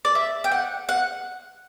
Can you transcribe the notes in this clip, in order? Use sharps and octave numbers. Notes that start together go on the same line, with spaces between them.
D5
E5
G5
F#5
F#5